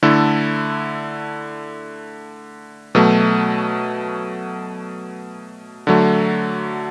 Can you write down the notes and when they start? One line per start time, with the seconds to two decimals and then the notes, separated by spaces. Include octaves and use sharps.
0.03 D3 A3 E4 A4
2.95 B2 F#3 A3
5.87 D3 F#3 A3